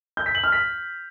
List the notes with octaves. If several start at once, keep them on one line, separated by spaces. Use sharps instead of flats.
G6
B6
F#7
F6
B6